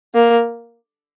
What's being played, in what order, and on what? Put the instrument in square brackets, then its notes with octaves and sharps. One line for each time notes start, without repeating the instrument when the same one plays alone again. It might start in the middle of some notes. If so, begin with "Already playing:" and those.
[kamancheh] A#3